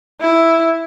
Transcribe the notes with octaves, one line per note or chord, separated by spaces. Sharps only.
E4